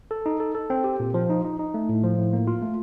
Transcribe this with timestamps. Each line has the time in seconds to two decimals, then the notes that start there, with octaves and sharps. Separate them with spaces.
0.11 A4
0.26 D#4
0.40 A4
0.55 A4
0.70 C4
0.84 G4
1.00 A#2
1.14 F3
1.30 D#4
1.45 D#4
1.59 D#4
1.74 A3
1.89 A2
2.04 F3
2.18 A2
2.33 A#3
2.47 F4
2.62 A3